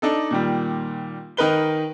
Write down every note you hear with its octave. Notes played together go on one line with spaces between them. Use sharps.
D4 D#4 A4
A#2 D#3 G3
D#3 D#4 A#4 B4 G7